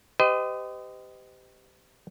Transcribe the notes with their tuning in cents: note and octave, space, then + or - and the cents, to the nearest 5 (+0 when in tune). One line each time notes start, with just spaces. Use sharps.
G4 +0 C5 -45 D#5 +0